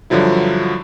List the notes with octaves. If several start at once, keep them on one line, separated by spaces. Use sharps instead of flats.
G2 D3 F3 F#3 E4